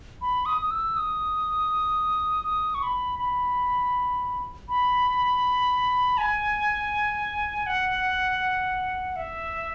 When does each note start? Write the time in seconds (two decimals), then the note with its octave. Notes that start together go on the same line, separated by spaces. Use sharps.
0.22 B5
0.46 D#6
0.61 D#6
0.71 E6
0.97 D#6
2.44 D#6
2.75 C#6
2.83 B5
3.19 B5
4.69 B5
6.18 G#5
7.66 F#5
9.16 E5